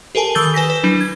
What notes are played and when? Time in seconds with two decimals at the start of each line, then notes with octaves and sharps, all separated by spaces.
0.15 G4 A4 A#4 G#5 A5
0.35 D#3 D#6 E6 G6 A6 G7
0.54 B4 G#5 A#6 B6
0.70 B4
0.83 F#3 D4 E4
1.01 G#6